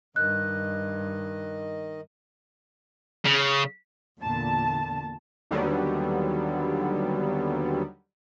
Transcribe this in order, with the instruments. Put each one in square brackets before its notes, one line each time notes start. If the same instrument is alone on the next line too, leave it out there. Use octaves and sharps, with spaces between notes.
[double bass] G2 [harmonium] D#3 D#5 [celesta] F#6
[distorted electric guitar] C#3
[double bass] E2 D3 [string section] A#2 A5
[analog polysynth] D#2 D3 F#3 G3 B3